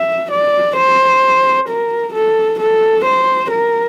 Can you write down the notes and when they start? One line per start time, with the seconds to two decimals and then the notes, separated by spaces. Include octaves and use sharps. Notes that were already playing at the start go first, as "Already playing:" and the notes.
Already playing: E5
0.31 D5
0.77 C5
1.69 A#4
2.14 A4
2.60 A4
3.05 C5
3.51 A#4